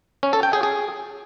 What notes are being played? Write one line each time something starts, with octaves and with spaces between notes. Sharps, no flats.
C#4
A4
G5
G#4
G#4